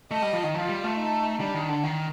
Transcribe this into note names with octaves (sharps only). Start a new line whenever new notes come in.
A3 D#5
G3
F3
D#3
F3 F4
G3
A3
D#4
G3 D4
D#3
D3
D#3